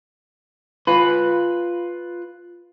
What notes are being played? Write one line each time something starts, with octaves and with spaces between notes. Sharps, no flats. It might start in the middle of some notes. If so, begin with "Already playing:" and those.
F4 B4